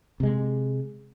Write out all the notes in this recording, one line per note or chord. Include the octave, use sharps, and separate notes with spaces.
C3 G#3